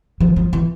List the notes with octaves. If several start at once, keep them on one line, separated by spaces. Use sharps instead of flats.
F3
F3
E3